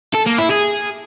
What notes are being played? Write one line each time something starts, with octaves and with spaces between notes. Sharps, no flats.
A4
A#3
E4
G#4